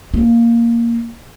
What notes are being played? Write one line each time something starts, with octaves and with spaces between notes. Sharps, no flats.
A#3